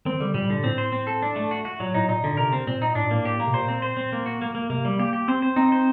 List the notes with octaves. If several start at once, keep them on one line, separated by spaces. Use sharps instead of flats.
D#3 C4
D3 G3
A#2 G3
A#2 D3
A2 C4
C5
C4
A4
D4
A3
F#4
F#4
A#2 F#3
A2 D#4
A#2 D#4
A#2 D3
C3 A#4
C4
A#2 C4
D#4
A2 D4
A#2
A2 A#3
A2 G4
A#3
C3
A#2 C5
C4
C5
C4
A#3
F#4
A#3
A#3
C3 A#3
G3
A#3 G4
G4
C4 C5
C5
C4 D#4
C5